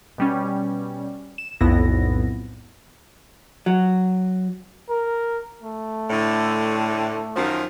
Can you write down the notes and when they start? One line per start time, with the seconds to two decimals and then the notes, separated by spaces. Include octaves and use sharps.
0.18 B2 G3 C#4
1.38 E7
1.61 B1 F2 A2 B3 E4 A#6
3.66 F#3
4.90 A#4
5.63 A3
6.10 A2 D3
7.35 F#2 D#3 F3